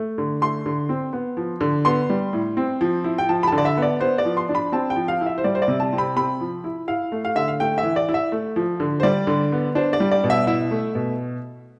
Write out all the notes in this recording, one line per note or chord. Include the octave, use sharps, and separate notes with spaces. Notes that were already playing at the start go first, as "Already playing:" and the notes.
Already playing: A3
D3
A3 C6
D3
C4
B3
F3
D3
B3 C6
G3
A2
C4
F3
E4
G5
F3 A5
B5
D3 A5
D5
E5
B3 D5
B3 C5
D5
F3
C6
D4
B5
C4 A5
G5
F3
F5
E4
E5
C5
G3 D5
C5
D5
C3
A5
C4
B5
C4 B5
F3
E4
E4 F5
A3
F5
D3 E5
F5
A3 G5
E5
E3
D5
E4
E5
A3
F3
D3
C5
G3 D5
D3
B3
D4 C5
D5
G3
D5
B2
E5
E4 E5
A3
B2